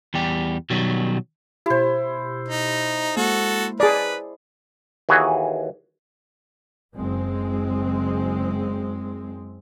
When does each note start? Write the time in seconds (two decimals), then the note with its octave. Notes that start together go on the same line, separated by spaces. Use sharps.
0.14 E2 G3 G4
0.70 B2 D#3 F#3 G3
1.66 B2 E4 G4 C5
2.48 D#4
3.17 G#3 A#3 F#4 A4
3.80 G#4 B4 D5 A#5 D#6
5.09 D#2 E3 F#4 G#4 B4
6.95 F#1 G#3 C4